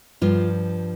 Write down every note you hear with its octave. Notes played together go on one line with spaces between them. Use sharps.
G2 F3 F4